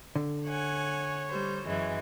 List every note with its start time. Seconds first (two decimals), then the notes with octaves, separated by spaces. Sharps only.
0.15 D3
0.46 C#5 F#5 G#5
1.30 G3 C5
1.66 F#2 E3 G#3